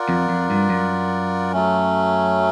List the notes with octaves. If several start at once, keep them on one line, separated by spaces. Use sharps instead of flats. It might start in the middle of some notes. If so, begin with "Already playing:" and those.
Already playing: F4 A#4 D5 F#5
F2
F2
G2
F#2
F#3 A3 C#4